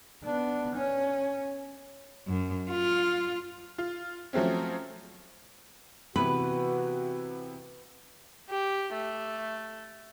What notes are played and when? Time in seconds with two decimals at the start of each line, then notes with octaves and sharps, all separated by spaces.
0.25 B3 D4
0.76 C#4
2.27 F#2
2.70 F4
3.78 F4
4.33 F3 F#3 A3 C4 C#4
6.16 C3 E3 B3 F#4 B4
8.49 G4
8.93 A3